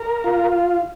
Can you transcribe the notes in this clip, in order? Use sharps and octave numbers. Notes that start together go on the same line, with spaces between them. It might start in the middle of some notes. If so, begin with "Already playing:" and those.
Already playing: A#4
F4